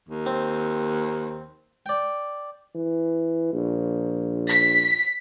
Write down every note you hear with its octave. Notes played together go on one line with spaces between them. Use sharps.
D#2
C4
D5 G5
E3
A#1
B6